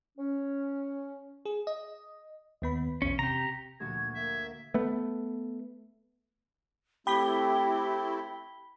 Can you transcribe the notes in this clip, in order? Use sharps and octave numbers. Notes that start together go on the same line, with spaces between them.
C#4
G#4
D#5
D#2 B3 B5
A#1 E2 C#4
C3 G4 A#5
D2 A#2 F3 F#4 G#6
A#3 E5 G#6
A3 B3
A3 C4 E4 G4 G5 B5 B6 G7